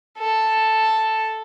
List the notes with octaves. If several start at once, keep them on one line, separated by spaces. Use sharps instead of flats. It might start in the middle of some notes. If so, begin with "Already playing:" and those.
A4